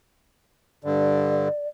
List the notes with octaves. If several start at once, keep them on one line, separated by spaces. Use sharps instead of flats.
G2 D3 D5